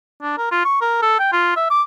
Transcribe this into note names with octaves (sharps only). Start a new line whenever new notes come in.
D4
A#4
F4
C#6
A#4
A4
G5
F4
E5
D6